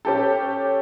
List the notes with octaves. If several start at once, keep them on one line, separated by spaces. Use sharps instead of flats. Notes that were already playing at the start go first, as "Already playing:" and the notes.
C#4 G4 A4